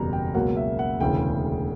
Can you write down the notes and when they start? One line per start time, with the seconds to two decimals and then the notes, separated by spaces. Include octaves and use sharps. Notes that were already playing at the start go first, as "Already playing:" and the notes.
Already playing: F#1 E2 B2 G3 A#5
0.13 G5
0.34 C#2 B2 F#3 A#3 F#5
0.57 E5
0.79 F#5
1.00 E1 D2 C#3 E3 G5